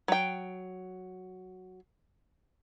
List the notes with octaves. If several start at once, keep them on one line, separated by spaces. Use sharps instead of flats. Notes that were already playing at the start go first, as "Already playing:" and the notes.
F#3 G5